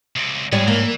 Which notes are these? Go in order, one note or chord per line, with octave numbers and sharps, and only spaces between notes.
C#2 C3
G#2 G3 B3 G#4 C#5
E3 A#3